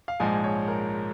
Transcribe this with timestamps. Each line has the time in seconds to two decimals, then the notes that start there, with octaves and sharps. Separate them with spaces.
0.08 F5
0.20 A#1 G#2 F3 G#3 G#5
0.44 C#5
0.68 A#4